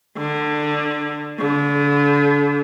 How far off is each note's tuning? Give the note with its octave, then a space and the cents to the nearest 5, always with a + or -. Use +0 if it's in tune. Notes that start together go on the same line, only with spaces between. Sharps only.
D3 +20
D3 -35